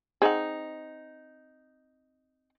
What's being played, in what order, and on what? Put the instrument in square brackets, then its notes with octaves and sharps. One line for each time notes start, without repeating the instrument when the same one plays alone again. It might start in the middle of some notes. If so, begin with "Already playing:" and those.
[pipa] C4 D#4 [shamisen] G#4 F#5